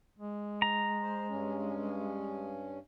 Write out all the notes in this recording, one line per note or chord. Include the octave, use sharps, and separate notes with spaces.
G#3
A#5
C5
G2 C#4